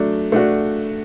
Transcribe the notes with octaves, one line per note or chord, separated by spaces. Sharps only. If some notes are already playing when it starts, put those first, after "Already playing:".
Already playing: F#3 A3 D4
A3 D4 F#4